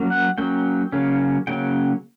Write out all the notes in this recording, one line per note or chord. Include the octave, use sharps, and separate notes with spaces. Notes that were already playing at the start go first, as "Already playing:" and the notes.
Already playing: F#3 A#3 C#4
F#5
F#3 A#3 C#4 G5
C#3 F#3 A#3 C#4
C#3 F#3 A#3 C#4 G5